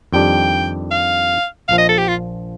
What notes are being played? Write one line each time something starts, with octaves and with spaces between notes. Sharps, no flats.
F2 D#3 G3 D4 G4 G5
F5
A#1 A#2 F3 F5
D#5
A4
G4
F4